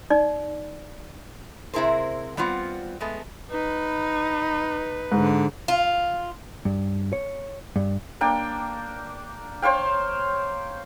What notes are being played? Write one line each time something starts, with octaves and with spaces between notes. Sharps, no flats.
D#4 D5
C3 C4 E4 G#4 A#4 C5
G3 B3 C4 F4 F#5
G#3 A3 B3
D#4 B4
G#2 D3
F4
G2
C#5
G2
A#3 D4 G5
C5 C#5 F5 G5